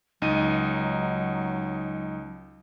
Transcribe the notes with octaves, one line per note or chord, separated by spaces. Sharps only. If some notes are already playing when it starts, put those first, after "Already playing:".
C#2 F#3 D#4 D#7